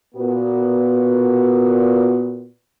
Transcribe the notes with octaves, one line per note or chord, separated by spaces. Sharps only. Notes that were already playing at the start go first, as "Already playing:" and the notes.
A#2 B3 F#4